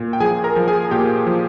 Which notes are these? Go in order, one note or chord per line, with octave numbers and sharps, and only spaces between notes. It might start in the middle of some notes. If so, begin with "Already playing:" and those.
Already playing: A#2
G5
F3 G#4 G#5
A#4 A#5
F3
G#4 G#5
A#2 G4 G5
F3